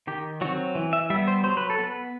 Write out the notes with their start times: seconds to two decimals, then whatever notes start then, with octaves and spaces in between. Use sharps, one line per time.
0.07 D#3 G4
0.41 F#3 C4 F#4
0.75 E3
0.93 E5
1.10 G3 E5
1.15 B3
1.27 C5
1.43 F#3 C5
1.57 B4
1.70 A4
1.78 B3 B4